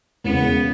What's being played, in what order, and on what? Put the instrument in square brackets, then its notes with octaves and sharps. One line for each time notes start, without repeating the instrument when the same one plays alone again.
[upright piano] E1 E2 C#3 [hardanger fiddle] B3